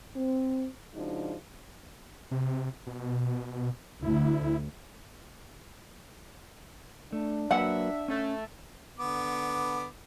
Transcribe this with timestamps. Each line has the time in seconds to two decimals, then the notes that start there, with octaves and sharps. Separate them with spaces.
0.16 C4
0.94 C#3 F3 G#3 D4 D#4 F#4
2.31 C3
2.87 B2
4.02 D2 E4
7.12 A3 D4
7.51 F#3 A#3 B4 E5 F#5
8.08 A3 C#4
8.99 D3 B3 D6